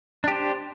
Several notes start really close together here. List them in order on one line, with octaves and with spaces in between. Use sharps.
D4 G4 C5